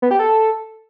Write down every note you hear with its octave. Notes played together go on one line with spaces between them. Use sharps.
B3
G4
A4